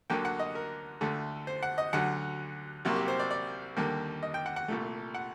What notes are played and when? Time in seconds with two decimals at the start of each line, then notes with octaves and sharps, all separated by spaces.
0.10 D2 D3 F#3 A#3 G5
0.25 F#5
0.39 D#5
0.55 A#4
1.01 D2 D3 A3
1.47 C5
1.63 F#5
1.78 D#5
1.93 D2 D3 F#3 F#5
2.85 C2 C3 F#3 A#3
2.96 G4
3.08 C5
3.19 D5
3.30 D5
3.77 D#2 D3 G3 A#3
4.23 D#5
4.34 G5
4.46 F#5
4.56 F#5
4.68 C2 A#2 A3
5.15 F#5